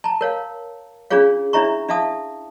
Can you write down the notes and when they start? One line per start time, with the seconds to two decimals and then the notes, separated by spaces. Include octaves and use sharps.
0.04 A5 A#5
0.21 A#4 C#5 F5
1.10 C#4 D4 F4 G#4 C#5 F5
1.53 D4 E4 C#5 E5 A#5 C#6
1.88 D4 E5 F5 A5 D#6